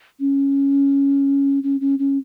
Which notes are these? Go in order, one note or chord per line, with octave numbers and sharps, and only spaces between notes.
C#4
C#4
C#4
C#4